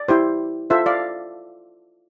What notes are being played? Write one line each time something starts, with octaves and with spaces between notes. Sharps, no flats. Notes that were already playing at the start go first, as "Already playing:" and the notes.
Already playing: D5
E4 G4 C5
F4 A4 C5 E5
D5 F5